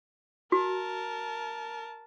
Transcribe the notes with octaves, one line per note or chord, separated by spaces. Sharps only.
F#4 A#4 A5